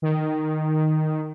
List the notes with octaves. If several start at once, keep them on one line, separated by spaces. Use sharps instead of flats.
D#3